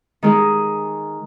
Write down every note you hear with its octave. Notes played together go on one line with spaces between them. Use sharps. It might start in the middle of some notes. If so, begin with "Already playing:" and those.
D#3 G#3 D#4 G#4